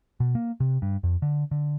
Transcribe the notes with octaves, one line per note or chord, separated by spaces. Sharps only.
B2
A#3
C3
G2
F2
D3
D3